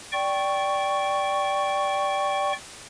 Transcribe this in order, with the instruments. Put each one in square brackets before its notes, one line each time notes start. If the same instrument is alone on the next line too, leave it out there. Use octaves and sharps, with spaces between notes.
[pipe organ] D5 G5 C#6